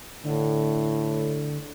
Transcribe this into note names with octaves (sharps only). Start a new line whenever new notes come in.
A2 D3